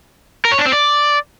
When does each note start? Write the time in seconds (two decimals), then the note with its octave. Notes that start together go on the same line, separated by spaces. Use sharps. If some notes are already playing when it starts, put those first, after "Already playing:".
0.45 A#4
0.52 C#5
0.59 D4
0.66 C4
0.73 D5